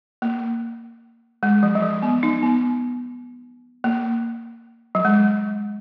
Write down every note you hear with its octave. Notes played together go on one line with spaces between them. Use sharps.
A#3
G#3
F3
F#3
F3
B3
D#4
B3
A#3
F#3
G#3